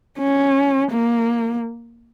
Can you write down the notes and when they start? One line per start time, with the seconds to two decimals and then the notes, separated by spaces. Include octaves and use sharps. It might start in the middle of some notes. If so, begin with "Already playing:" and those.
0.19 C#4
0.91 A#3